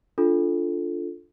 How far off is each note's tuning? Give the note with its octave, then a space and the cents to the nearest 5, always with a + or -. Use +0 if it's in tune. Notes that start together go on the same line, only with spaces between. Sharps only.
D4 -5 F4 +0 A4 +0